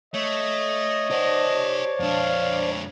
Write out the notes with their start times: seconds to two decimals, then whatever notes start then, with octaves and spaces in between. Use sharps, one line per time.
0.14 A3 C#5 D#5
1.11 G4 C5 D5 F#5 A5
2.00 F2 D4 F5